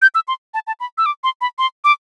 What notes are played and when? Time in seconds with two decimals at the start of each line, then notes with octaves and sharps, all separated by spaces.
0.02 G6
0.15 E6
0.28 C6
0.54 A5
0.67 A5
0.80 B5
0.98 E6
1.06 D6
1.24 C6
1.41 B5
1.58 C6
1.84 D6